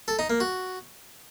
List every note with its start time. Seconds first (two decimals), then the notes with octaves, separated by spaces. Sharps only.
0.08 A4
0.19 D#4
0.30 A#3
0.40 F#4